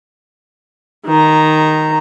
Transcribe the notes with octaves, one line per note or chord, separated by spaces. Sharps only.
D#3 A#5